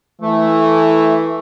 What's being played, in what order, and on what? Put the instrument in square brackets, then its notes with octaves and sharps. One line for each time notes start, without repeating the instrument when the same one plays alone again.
[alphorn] E3 [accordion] A3